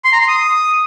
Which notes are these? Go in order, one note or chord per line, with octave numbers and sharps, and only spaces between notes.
C6
A#5
C6
D#6